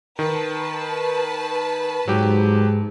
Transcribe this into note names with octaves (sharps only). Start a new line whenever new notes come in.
D#3 B4 A5
G#2 F#3 G4